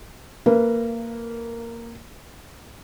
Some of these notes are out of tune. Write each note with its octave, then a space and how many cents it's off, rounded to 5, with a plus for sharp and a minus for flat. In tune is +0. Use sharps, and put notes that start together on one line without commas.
A#3 -10 B4 -15 F5 -35